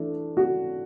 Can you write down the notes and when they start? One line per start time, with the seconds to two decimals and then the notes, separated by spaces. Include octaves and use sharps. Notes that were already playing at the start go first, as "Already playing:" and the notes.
Already playing: E3 A3 D4
0.37 F#4